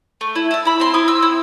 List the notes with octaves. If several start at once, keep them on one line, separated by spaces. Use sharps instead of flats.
A3
E4
E4 A5
E4 B5
C4 C6
E4 D#6
C4 E6
E4